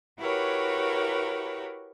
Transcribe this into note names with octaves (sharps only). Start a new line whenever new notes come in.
E4 F#4 G4 A#4 B4 C#5